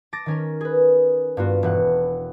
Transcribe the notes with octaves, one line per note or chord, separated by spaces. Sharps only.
A5 D6 A6 A#6
D#3 C#4 A#4
G#4 B4
G2 B3 F4 F#4
E1 B2 F#5